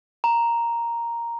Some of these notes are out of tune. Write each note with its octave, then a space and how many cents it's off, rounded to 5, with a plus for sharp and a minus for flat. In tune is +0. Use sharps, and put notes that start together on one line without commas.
A#5 +0